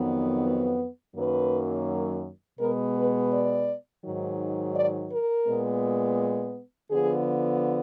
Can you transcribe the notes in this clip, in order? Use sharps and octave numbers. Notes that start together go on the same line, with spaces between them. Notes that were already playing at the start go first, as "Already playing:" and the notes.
Already playing: F2 D#3 F#3 B3
F#2 D#3 F#3 A#3 B4
B2 G#3 B3 A#4
B4
D5
G#2 D#3 F#3
D5
A#4
A#2 G#3 B3
D3 F3 B3 G#4